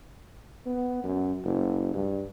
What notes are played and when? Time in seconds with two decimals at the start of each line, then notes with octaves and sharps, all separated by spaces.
0.66 B3
1.04 F#2
1.45 F#1
1.94 G2